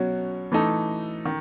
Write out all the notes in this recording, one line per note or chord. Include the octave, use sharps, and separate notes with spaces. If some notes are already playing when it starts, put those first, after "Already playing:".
Already playing: B2 F#3 C#4 F#4
E3 A3 D#4 A4
D#3